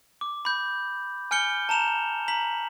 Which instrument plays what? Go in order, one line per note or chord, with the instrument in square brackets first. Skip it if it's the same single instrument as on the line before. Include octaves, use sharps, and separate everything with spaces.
[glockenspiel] D6
B5 G6
G#5 F6 G6 C#7 G7
A5 A#5 E7 F7
A#5 B6 F#7